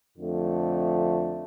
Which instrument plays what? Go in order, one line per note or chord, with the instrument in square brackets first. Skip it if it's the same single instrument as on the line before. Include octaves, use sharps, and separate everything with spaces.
[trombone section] F2 D3 A3